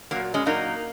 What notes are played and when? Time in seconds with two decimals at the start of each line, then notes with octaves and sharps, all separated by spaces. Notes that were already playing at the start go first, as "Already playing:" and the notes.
0.11 A#2 F#3 A#3
0.34 G#3 C#4
0.46 A#2 F#3 A#3 D#4